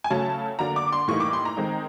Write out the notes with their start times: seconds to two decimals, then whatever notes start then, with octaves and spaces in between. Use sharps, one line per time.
0.04 G#5
0.10 C#3 F#3 A3 C#4 A5
0.59 D3 F#3 A#3 D4 A#5
0.76 D6
0.92 C6
1.08 A2 E3 G3 A#3 D#4 C#6
1.20 D6
1.33 C6
1.45 A#5
1.57 D#3 G#3 C4 D#4